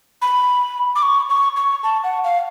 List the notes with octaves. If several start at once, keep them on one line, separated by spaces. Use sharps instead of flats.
B5
D6
C#6
C#6
C#6
A5
F#5
F5